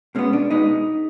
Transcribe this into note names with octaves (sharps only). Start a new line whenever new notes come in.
B2 G#3 B3 C#4
D4
B2 G#3 B3 D#4